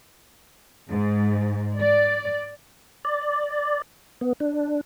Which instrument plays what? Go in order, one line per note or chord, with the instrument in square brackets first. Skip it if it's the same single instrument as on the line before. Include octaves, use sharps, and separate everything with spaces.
[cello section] G#2
D5
[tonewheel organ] D5
B3
D4